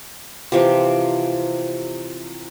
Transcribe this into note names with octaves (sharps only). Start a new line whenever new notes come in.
C3 E3 F3 G4